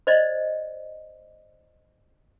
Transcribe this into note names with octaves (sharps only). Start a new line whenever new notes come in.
C5 D5 D#5